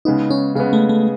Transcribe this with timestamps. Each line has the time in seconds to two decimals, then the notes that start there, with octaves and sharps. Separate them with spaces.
0.05 C#3 G#3 B3 D#4
0.31 C#4
0.55 C#3 G#3 B3 C#4
0.73 A3
0.89 A3